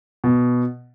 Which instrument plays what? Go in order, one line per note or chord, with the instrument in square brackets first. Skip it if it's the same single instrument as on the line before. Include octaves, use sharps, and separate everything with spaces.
[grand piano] B2